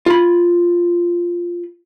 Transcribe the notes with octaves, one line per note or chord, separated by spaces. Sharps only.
F4 B5